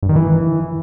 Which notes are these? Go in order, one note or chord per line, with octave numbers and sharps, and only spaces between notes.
G2
D#3
E3